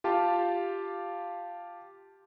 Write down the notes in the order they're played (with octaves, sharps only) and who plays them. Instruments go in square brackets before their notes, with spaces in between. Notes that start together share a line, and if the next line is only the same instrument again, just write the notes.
[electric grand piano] F4 G4 F5 A5